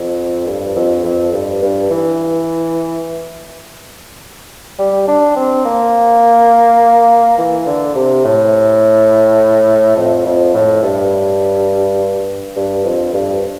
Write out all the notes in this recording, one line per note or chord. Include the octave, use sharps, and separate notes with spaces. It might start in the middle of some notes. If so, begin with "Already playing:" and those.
Already playing: F2
G2
F2
F2
G2
G2
E3
G3
D4
C4
A#3
E3
D3
C3
A2
F2
F2
A2
G2
G2
F2
G2